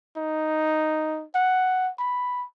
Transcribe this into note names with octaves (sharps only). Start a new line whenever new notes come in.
D#4
F#5
B5